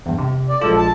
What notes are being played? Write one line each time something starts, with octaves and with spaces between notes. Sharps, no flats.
E2 G2
C3
D5
A#1 G#3 F4 A4
A5